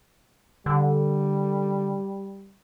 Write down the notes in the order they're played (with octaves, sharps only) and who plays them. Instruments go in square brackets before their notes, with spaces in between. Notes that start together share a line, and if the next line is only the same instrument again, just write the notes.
[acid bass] D3 [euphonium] G3